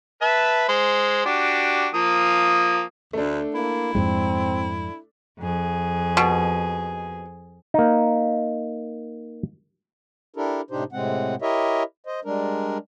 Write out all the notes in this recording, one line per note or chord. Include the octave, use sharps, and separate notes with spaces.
B4 E5 A5
G#3 C5
D4 F#4 G4
F3 A#3 D#6
D2 A3 D4
A#3 E4
F2 G#2 G#3 C4
F2 G#4
B2
A#3 D#4
D4 E4 G4 A4 A#4
A2 C3 D4 D#4 G4 C5
A2 C3 G#3 C4 F#5
E4 G4 A#4 C#5 D#5 E5
C5 D#5
G3 G#3 D4 A#4